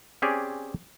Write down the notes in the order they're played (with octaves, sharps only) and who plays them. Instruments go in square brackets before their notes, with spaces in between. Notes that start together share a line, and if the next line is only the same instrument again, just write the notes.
[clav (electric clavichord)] C4 C#4 G4 G#4 D5